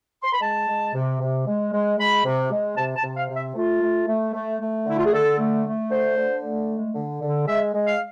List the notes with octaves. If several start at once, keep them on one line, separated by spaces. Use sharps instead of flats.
C6
B5
G#3 A5
G#3
C3
C3
G#3
G#3
G#3 B5
C3
G#3
C3 A5
A5
C3
F5
C3
E5
A3 F4
A3
A3
A3
A3
D3 E4
F4
G#4
D3 A4
A3
A3
D3 C5
D3
A3
G#3
D3
D3
G#3 E5
G#3
F5